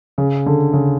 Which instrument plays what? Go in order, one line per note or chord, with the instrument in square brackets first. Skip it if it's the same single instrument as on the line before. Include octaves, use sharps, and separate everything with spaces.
[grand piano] C#3
D3
C#3